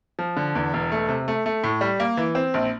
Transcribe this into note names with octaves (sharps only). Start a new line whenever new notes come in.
F3
D3
E2
E1
A3
C3
A3
A3
A2
G3
A#3
E3
C4
A#1